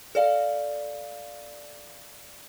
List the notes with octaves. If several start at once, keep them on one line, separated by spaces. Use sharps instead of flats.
A4 D5 F5